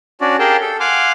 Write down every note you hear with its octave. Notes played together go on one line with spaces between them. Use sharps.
C#4 D4 F#4 D5
G4 G#4 A#4 F5 G5 A5
A4
F5 F#5 G#5 C6 D6 F6